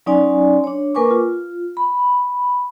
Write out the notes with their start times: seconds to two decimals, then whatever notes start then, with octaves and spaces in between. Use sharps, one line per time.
0.06 F#3 C#4 D#4 D5 G#5 C6
0.64 D4 C#5
0.95 A#3 A#4 B4 G#5 C#6 D6
1.11 F4
1.77 B5